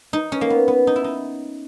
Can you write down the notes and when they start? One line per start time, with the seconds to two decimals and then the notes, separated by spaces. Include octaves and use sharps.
0.13 D#4
0.32 C#4
0.41 A#3
0.50 B3
0.68 B3
0.87 D#4
0.96 E4
1.04 D#4